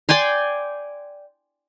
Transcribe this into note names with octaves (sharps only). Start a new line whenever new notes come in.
D5 G5 G#5 C6